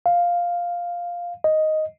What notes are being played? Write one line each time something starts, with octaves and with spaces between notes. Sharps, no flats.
F5
D#5